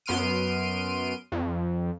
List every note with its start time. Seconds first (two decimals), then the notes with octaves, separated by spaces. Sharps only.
0.06 F#2 B3 C6 F6 D7 D#7
1.32 F2